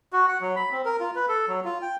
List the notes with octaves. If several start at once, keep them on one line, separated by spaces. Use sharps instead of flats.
F#4
F#5
F#3
B5
C4
A#4
F4
B4
A4
F#3
F4
G5